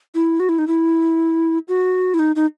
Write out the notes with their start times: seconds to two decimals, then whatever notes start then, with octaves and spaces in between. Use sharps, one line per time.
0.15 E4
0.40 F#4
0.49 E4
0.59 D#4
0.67 E4
1.68 F#4
2.14 E4
2.19 D#4
2.36 D#4